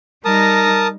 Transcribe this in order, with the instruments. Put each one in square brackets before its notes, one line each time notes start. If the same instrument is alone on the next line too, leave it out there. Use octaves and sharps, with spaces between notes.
[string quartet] G3 D#4 A#6 [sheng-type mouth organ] A#4 A5 D#6